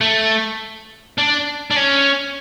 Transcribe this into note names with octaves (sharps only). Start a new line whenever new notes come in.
A3
D4
D4
C#4